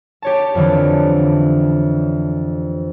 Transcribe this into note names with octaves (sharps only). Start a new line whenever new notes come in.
G4 C#5 A5
F2 D3 E3